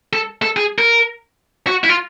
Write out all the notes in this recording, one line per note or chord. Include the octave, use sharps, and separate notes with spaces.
A4
A4
G#4
A#4
F#4
E4
F4